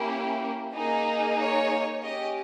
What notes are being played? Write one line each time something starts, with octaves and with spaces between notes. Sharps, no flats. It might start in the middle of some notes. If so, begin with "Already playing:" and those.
Already playing: A#3 C#4 E4 G4
A#3 D#4 G#4
C#5
C#4 G4 D#5